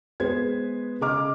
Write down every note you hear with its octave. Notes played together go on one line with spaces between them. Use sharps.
G#3 B3 G#4 B4 C5 G#6
C#3 G#4 D#5 A#5 D6 F6